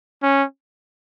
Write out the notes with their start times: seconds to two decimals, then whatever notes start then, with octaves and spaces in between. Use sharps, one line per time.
0.23 C#4